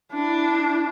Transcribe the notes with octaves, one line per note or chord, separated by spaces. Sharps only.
D4 E4